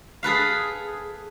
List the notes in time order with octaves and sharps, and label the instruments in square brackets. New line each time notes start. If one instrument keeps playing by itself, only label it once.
[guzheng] G#4 A4 B4 F5